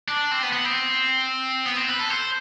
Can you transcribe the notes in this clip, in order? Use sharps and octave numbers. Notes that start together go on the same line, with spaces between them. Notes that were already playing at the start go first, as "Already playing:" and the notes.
D4
C4
B3
B3
C4
B3
C4
B4
A4
C5